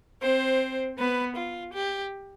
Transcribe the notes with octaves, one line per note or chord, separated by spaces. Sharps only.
C4 C5
B3 B4
F4
G4